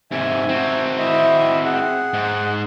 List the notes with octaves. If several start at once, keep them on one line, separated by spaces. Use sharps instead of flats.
G#2 C3 E5 G#5
C4 F#4
E4 D#5 E5
G#4 F#5
G#2